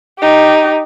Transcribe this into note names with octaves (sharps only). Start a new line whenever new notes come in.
D#4 G4